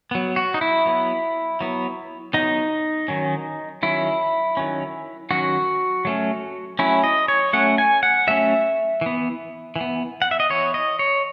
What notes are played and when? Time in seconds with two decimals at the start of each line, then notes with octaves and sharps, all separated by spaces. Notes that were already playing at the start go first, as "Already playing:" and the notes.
0.11 F#3 B3
0.36 F#4
0.54 D#4
0.61 E4
0.86 F#3 B3
1.61 F#3 B3
2.34 F#3 B3 D#4
3.08 D#3 F#3 C#4
3.83 D#3 F#3 C#4 E4
4.57 D#3 F#3 C#4
5.31 D#3 F#3 C#4 F#4
6.05 F#3 A3 C#4
6.79 F#3 A3 C#4 E4
7.04 D#5
7.28 C#5
7.53 F#3 A3 C#4 F#5
7.78 G#5
8.03 F#5
8.27 F#3 A3 C#4 E5
9.01 E3 B3
9.76 E3
9.81 B3
10.22 F#5
10.31 E5
10.40 D#5
10.50 E3 B3 C#5
10.74 D#5
10.99 C#5